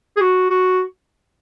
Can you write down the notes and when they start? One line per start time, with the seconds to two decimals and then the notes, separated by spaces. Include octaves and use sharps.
0.17 G#4
0.21 F#4
0.50 F#4